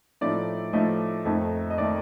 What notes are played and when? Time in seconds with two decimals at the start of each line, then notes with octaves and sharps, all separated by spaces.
0.21 A2 F3 A3 D#4 D5
0.73 A2 F3 A3 D#4 D#5
1.25 F2 D#3 A3 D#4
1.70 D#5
1.78 D#3 A3 D#4 D5